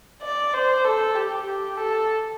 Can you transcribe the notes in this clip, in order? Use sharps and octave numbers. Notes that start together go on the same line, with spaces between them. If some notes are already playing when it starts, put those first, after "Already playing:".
D5
C5
A4
G4
G4
A4